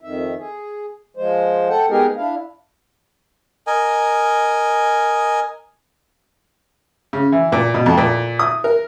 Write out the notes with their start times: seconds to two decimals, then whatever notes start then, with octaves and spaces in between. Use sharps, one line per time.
0.01 F2 D#3 E5
0.38 G#4
1.17 F3 G#3 C5
1.68 A4 F#5 G5
1.89 G#3 B3 D#4 G4 G#4 A#4
2.16 D4 E4 F5
3.67 A#4 D#5 G#5
7.13 C#3
7.32 E3
7.52 A#2
7.74 B2
7.86 F2
7.97 A#2
8.39 D#6
8.64 A#4